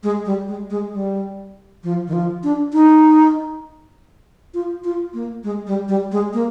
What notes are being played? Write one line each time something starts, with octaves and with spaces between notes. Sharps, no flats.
G#3
G3
G#3
G#3
G3
F3
D#3
F3
D4
D#4
F4
F4
A#3
G#3
G3
G3
G#3
A#3